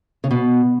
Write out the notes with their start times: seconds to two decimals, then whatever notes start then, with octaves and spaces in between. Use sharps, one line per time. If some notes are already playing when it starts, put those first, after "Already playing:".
0.24 C#3
0.31 B2